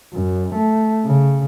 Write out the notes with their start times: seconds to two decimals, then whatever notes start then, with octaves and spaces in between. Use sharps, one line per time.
0.14 F#2
0.55 A3
1.05 C#3